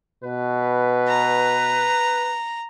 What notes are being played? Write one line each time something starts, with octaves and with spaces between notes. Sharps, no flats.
B2 B4
A#5